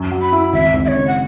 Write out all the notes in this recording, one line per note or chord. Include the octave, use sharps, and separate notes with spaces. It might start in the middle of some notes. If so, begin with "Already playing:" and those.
Already playing: F#2
F#3
B5
E4
G#1 E5
G#1
E5
C#5
C#3
F#5